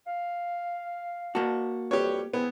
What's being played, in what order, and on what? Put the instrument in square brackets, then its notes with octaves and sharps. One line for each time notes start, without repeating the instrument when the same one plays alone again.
[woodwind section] F5
[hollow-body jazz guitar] A#3 F#4 [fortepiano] A5
[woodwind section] F2 G3 [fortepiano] G4 B4 C#5
[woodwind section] G#3 C4 E4 [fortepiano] B3